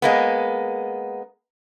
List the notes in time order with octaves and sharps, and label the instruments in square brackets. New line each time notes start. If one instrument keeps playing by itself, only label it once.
[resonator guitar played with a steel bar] G#3 A#3 B3